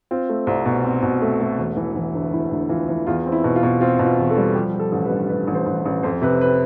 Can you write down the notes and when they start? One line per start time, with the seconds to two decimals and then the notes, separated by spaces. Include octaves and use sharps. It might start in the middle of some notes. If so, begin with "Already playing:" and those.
0.11 C4 F4
0.29 A3
0.47 C2
0.65 B2
0.84 C4
1.02 B2
1.22 A3
1.41 A3
1.58 E1
1.77 E3
1.96 E3
2.15 D2
2.32 E3 E4
2.51 D2
2.69 E3 F4
2.88 E3
3.07 E2 F4
3.26 C4
3.32 E4
3.44 B2
3.56 F4
3.63 B2
3.81 C4 F4
3.99 B2
4.05 F4
4.19 E2
4.30 A4
4.37 G3
4.55 F3 G4
4.74 F3
4.79 A4
4.92 A1
5.05 B4
5.11 G2
5.29 G2 B4
5.47 A1
5.55 C5
5.66 A1
5.86 A1
6.03 F2 C5
6.22 C3 B4
6.41 B4